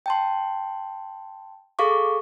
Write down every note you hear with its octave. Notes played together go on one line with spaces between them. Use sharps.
G5 A5 C6
G#4 A4 F5 C#6 D6